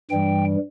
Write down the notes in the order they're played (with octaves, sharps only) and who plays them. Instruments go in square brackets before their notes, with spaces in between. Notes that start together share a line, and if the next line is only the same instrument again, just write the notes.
[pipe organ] G2 E3 G3 G5